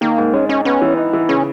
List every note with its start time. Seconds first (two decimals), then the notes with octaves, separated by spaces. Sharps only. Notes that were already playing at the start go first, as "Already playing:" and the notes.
0.01 D#3 A#3
0.18 G#2
0.33 G#3 C#4
0.49 C#4 D#4
0.65 B3 C#4
0.82 E3
0.97 D#4
1.13 E3
1.29 C#3 C#4